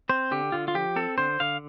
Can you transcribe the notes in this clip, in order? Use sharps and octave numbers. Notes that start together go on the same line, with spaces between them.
C4 C5
D3 G4
D3 F4
F4
F3 G4
C4 A4
D3 C5
D3 F5